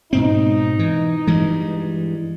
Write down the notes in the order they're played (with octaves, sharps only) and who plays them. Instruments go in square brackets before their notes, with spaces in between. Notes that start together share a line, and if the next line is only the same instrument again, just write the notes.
[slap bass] G#2 B2 C4 [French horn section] D#4
[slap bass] E3
G2 E3 G#3